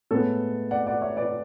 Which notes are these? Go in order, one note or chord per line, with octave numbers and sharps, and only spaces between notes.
A2 G#3 B3 A4 C#5
D5 F#5
D5 F#5
C#5 E5
B4 D5